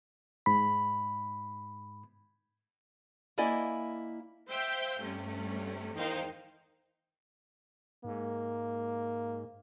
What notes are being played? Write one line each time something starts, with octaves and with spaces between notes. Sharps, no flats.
G#2 B5
A#3 E4 D5 D#5 G#5
C5 E5 F5 G5 G6
G2 C3 A3 C#4
E2 D#3 D#4 C5 F5 G5
G#2 A#3